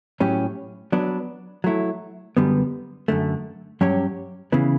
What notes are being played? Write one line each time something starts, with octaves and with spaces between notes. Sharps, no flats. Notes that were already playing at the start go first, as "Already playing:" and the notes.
A2 F#3 C#4 G4
F#3 B3 D4
F#3 A3 E4
F#2 D3 G3 B3
F#2 D3 A3
G2 F#3 C#4 G4 C#5
C#3 E3 B3